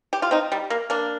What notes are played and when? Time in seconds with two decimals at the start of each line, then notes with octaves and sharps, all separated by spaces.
0.13 G4
0.22 F4
0.31 C4 D#4
0.52 G3
0.70 A#3
0.90 A#3 D4